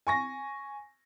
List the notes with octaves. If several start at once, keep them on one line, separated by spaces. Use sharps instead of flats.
G#5 C#6 A#6